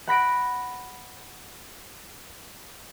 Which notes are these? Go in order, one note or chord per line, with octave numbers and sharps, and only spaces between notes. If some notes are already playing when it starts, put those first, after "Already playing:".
F#5 B5 A#6 D7